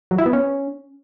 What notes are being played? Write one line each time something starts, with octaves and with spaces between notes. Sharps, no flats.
F#3
E4
B3
C#4